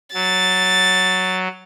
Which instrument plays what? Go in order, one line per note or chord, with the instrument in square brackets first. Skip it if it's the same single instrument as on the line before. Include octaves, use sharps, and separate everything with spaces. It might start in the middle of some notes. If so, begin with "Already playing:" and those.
[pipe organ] F#3 [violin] A6